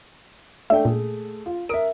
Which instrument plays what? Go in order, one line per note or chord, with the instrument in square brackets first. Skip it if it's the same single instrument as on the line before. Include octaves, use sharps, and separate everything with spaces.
[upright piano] A3 D4 G5 [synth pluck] E5
[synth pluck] A#2 [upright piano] A3 G#4
[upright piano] F4
[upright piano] A#4 E5 [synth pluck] D#6 D7